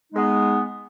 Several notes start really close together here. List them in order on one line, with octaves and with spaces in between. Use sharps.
D#4 G#3 B3